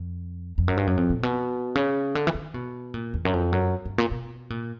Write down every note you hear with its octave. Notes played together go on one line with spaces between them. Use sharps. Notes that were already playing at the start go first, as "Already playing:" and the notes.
Already playing: F2
F2
F#2
G2
F#2
F2
A#2
B2
C#3
D3
E3
D#3
B2
A#2
E2
F#2
F2
F#2
G2
A#2
B2
A#2